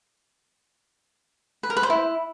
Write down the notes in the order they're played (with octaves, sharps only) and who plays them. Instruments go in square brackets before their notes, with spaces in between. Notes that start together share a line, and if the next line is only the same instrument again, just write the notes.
[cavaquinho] B4
A#4
B4
C5
E4